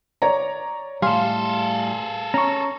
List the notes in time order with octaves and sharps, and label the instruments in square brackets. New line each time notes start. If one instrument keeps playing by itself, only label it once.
[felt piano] C#5 D5 A#5
[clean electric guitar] A2 G3 [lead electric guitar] G#4 A4 [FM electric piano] F5 [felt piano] C6
[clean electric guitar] C#4 [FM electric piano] A#5 C#6